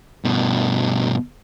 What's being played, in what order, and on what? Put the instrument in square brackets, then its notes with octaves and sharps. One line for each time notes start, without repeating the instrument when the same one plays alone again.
[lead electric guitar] G2 B2